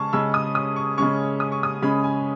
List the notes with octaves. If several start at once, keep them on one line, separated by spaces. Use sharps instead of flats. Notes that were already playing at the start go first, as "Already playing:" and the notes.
Already playing: C#3 G#3 C#4 A5 C#6
C#3 G#3 C#4 E6
D#6
D#6
C#6
C#3 G#3 C#4 C#6
D#6
C#6
D#6
C#3 G#3 C#4 B5
G#5